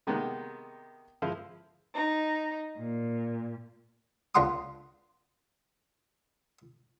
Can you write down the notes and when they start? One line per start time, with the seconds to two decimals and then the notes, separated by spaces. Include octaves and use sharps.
0.07 C3 D#3 G#3 A#3 B3
1.22 F3 G#3 E4 F5
1.94 D#4
2.77 A#2
4.35 C#2 D4 F4 F#5 C6 D#6